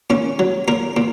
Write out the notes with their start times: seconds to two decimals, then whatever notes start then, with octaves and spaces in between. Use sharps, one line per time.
0.10 A#2 C#4
0.39 F#3
0.68 A#2 A#4
0.97 A#2